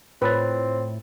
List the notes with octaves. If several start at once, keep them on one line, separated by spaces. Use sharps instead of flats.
A2 C4 F4 B4 C#5 A6